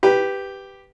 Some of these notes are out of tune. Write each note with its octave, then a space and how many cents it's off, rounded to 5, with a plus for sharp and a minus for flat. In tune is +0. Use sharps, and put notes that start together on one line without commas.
G4 +0 B4 +0